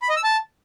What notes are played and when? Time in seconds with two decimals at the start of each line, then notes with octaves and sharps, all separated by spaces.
0.02 B5
0.09 D#5
0.16 E6
0.24 A5